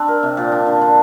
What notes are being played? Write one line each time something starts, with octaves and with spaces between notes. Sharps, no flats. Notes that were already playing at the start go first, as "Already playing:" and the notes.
Already playing: C4 D4
A#4
C3
A#2
D4
D3
D3